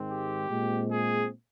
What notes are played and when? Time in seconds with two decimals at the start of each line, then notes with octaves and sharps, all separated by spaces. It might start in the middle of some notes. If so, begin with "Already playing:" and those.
Already playing: G#2 D#3 G#3 C4
0.10 G4
0.51 A#2 G#3 C4
0.90 G#4